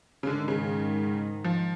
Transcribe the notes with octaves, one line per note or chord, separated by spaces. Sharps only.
C#3
G#2 D3 D#3 G#3
C#3
F3